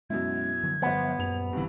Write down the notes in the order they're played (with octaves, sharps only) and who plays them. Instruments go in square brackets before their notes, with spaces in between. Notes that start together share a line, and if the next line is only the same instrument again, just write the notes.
[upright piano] F#2 B2 E4 [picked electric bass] G#3 C4 C#4 [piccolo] G#6
[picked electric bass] D3 F3 F#3
[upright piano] G1 C5 F#5 [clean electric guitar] B3
[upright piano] D#1 F7 [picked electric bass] F#2
[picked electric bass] A#1 C4 [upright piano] G2 E3 [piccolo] B5